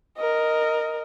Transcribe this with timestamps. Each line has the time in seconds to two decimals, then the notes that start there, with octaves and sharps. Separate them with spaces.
0.18 A#4 D#5